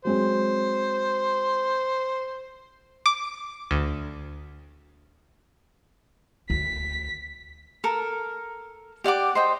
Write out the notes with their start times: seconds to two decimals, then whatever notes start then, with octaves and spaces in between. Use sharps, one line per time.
0.05 F#3 G#3 C4 C5
3.06 D6
3.71 D2
6.50 D2 B6
7.84 A4 A#4
9.04 G4 D5 F#5 D6
9.35 C5 D#5 G5